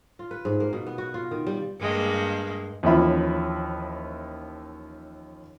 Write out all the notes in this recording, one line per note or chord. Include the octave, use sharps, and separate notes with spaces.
F4
B4
G#2
A#3
B2
B3
F#4
F4
D#3
G3
G2 G#3 A#3
D#2 E3 F3 C#4 E5 B5